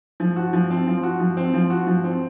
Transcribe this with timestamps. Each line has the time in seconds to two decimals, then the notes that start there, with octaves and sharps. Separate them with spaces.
0.20 F3
0.36 F#4
0.53 F3
0.70 C4
0.87 F3
1.03 F#4
1.20 F3
1.37 C4
1.54 F3
1.70 F#4
1.87 F3
2.04 C4